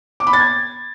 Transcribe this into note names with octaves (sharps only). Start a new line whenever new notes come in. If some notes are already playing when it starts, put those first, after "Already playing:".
D6
B5
A6
G#6